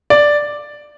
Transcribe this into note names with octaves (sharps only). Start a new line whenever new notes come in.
D5